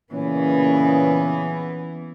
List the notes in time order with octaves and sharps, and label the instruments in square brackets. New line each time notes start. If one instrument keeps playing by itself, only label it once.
[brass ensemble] A#2 C#3 C#4 [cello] E3 B3